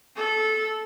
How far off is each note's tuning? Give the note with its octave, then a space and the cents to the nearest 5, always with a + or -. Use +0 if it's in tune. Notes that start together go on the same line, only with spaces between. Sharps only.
A4 -15